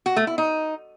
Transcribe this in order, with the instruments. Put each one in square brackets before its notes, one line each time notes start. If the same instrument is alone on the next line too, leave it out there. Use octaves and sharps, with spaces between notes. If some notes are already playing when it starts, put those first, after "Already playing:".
[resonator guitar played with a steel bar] F#4
A3
E4
D#4